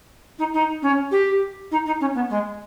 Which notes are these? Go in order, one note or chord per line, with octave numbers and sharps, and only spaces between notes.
D#4
D#4
C#4
G4
D#4
D#4
C#4
B3
G#3